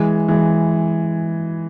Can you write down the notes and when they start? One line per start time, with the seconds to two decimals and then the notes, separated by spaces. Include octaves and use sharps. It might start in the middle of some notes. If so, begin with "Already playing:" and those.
Already playing: E3 G#3
0.28 E3 G#3